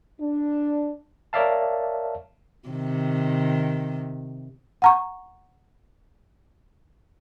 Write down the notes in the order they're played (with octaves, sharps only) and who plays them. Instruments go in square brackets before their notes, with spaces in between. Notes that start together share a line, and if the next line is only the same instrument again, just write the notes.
[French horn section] D4
[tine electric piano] A#4 C#5 D5 E5 F5 A5
[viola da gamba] C3 D#3
[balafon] F#5 A#5 C#6